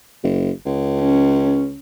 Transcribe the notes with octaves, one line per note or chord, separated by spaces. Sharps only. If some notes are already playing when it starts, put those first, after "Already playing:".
F#1
C#2
C#4